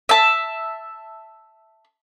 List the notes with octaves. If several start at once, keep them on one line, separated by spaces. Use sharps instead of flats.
E5 A5